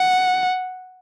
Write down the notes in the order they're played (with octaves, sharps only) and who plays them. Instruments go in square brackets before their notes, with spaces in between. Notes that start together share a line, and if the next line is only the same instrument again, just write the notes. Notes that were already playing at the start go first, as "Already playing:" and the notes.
Already playing: [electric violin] F#5